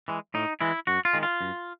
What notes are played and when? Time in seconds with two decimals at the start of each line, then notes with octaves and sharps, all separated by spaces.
0.08 E3 G#3
0.34 A2 D#4
0.61 E3 G#3 E4
0.87 F#2 F#4
1.05 F4
1.13 D#3 G#3
1.23 F4
1.41 F#2